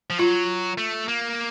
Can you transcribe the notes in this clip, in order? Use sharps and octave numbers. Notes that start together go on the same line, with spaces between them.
F3
F#3 F4
A3
A#3